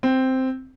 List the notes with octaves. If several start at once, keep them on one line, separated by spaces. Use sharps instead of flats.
C4